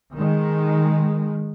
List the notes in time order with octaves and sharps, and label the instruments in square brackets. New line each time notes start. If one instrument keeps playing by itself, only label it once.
[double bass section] D#3 G#3